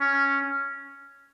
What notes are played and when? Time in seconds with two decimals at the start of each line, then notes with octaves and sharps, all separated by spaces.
0.01 C#4